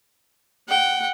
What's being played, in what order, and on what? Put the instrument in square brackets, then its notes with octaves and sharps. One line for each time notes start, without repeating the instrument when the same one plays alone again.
[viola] F#5 [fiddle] G5